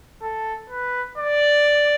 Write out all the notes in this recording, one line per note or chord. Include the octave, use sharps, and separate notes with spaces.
A4
B4
D5